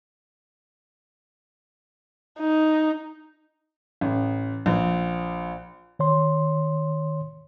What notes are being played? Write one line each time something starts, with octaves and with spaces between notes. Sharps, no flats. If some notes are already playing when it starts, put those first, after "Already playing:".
D#4
A1
A#1
D#3 C#5 C6